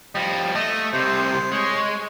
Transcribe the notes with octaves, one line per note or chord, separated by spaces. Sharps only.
F3 G3 D#5
A3 D#5
C2 C3 C5
G#3 C#5